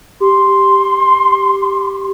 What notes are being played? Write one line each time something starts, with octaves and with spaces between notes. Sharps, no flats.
G4 C6